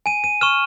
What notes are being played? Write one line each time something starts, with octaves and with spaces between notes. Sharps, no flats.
G#5 D#7
D#7
C#6 F6 E7